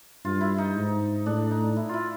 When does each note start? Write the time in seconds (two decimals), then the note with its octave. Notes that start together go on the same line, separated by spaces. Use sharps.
0.25 G2 F4
0.41 E4
0.58 D#4
0.76 G#2
1.26 A2 D4
1.51 D#4
1.76 E4
1.89 E4 F4